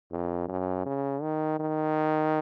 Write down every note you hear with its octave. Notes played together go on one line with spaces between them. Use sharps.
F2
F#2
C#3
D#3
D#3